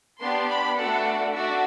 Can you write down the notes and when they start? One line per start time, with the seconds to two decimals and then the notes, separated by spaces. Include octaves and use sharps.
0.20 B3 D4 G4 C6
0.49 B5
0.77 A3 D4 F#4 A4 F#5
1.34 D4 F#4 E5